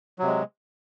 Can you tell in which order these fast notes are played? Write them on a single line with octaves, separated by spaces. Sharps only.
F#3 C3 G#3